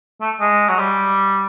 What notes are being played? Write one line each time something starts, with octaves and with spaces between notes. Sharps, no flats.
A3
G#3
F#3
G3